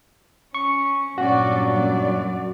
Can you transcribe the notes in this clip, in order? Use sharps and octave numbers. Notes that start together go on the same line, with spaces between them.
C#4 C#6
G2 A#2 F#3 C#4 F#4 D5
F#2 D5